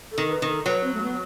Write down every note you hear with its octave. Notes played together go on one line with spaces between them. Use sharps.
A4
D#3
B4
D#3
A4
F#3 B4
C4
A3
B3